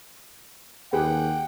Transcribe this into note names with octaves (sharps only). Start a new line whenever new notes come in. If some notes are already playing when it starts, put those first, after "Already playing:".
D#2 G4 G#4 B4 F#5 G5